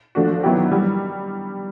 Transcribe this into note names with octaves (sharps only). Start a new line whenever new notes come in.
F3 A3 D4 F#4
D#3 F#3 B3 E4 G4
G3